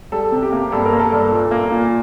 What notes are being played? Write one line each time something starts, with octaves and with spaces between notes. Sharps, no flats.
G3 A4
C3
G4
A#3
G2 A4
A#4
A#3
A4
G2
A#2
A#3
A#2